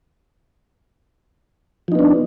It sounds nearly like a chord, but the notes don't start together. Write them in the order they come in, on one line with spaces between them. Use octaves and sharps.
F3 D#4 B3 D4